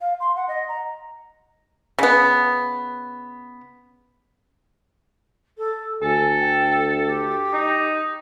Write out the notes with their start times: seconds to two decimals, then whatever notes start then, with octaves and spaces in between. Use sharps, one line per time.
0.01 F5
0.20 C6
0.36 F#5
0.48 D#5
0.68 A#5
1.99 C#3 B3
5.58 A4
6.02 D2 A4 G#5
6.40 G5
7.05 G4
7.53 D#4